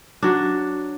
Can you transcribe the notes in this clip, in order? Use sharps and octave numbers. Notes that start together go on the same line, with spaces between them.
F#3 D4